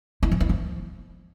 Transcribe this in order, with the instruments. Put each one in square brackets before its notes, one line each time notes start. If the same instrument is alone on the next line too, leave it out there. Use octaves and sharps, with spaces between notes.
[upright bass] E4
F3
E4
F3